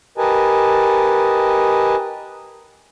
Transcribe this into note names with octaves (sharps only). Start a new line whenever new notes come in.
G4 A#4 B4 D#5 G#5 A5